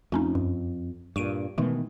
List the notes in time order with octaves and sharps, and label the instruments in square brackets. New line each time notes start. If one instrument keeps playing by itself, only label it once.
[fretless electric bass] F2 [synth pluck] A3 C#4 D#4
[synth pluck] F#2
[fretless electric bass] G2 A#2 [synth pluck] C#6 D7 D#7
[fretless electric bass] B2 D#3 E3 [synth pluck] G#3 A3